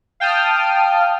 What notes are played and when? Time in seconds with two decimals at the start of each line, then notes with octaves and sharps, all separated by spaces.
0.20 F5 G5 A5 D#6 F6